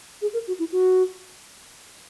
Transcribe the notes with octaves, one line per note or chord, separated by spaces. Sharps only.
G#4
A#4
F#4
E4
F#4